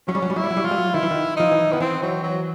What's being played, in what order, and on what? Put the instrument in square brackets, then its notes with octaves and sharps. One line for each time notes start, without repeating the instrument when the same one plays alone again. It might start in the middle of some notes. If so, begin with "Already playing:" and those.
[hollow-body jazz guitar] F#3 [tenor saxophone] C#4
[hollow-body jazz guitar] G3
F#3
G3
[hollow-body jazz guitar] F#3 [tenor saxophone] E4
[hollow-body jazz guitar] G3
F#3
G3
[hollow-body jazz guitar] F#3 [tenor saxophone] F4
[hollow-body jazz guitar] G3
F#3
[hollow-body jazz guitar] D#3 [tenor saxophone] E4
[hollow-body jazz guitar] E3
D#3
[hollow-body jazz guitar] F3 [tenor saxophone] D#4
[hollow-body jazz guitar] E3
[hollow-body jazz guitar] D#3 [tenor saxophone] B3
[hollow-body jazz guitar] E3 [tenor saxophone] C4
[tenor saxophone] F#3
F#3